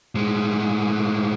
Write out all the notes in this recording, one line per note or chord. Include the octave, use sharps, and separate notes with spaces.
A2 G#3